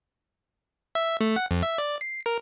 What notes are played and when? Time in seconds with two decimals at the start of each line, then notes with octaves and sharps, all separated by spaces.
0.95 E5
1.21 A3
1.36 F#5
1.51 F2
1.63 E5
1.78 D5
2.01 C7
2.26 A#4